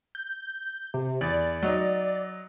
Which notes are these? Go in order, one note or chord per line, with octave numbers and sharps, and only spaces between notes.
G6
C3
E2 D5
F#3 D#4